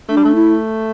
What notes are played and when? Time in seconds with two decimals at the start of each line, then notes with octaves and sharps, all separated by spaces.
0.09 A3 D4
0.17 G3
0.24 A3
0.35 E4